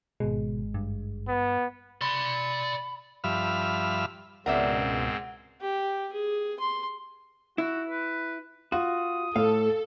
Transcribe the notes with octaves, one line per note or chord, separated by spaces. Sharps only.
G#1 B2 G#3
G2
B3
D5 B5 C6
G2 F3 E5 B5 F6
C#2 G#2 B2 C4 A#4 D5 E5 F#5
G4
G#4
C6
E4 F#4
B4
F4 F#4 D#6
A2 A4 F5